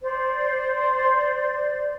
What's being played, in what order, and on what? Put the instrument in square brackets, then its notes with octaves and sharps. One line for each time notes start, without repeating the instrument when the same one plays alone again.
[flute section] C5 D5